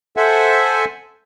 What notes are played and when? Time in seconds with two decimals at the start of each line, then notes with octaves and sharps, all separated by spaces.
0.17 A4 C5 E5 F#5 G#5